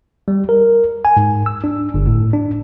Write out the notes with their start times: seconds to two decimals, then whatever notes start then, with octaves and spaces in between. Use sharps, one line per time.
0.28 G3
0.49 A#4
1.05 G#5
1.17 G#2
1.46 E6
1.64 D4
1.94 G1
2.07 A2
2.33 D4